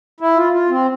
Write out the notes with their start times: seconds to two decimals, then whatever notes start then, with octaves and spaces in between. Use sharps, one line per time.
0.20 E4
0.37 F4
0.53 F4
0.70 C4